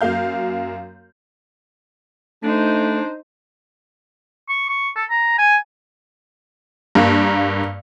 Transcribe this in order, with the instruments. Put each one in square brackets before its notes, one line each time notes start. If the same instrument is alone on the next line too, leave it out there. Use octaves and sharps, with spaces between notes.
[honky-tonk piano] F#2 F#3 A#3 F5 G6
[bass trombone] A3 [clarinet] D4 [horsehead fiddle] D#4 C5
[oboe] C#6
C#6
A4
A#5
G#5
[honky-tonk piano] G2 A#3